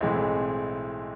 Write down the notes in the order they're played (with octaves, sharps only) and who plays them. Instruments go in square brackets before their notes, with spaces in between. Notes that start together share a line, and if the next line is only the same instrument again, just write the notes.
[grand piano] B1 A2 E3 G#3 C4